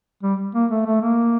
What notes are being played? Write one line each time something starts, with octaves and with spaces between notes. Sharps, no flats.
G3
A#3
A3
A3
A#3